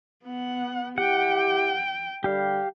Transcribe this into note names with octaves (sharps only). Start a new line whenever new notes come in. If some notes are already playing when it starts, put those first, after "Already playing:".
B3 F#5
E4 G4 F#5 G5
D3 G3 G4 F5